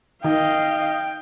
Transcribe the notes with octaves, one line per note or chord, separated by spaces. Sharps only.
D#3 D#5 F5 G5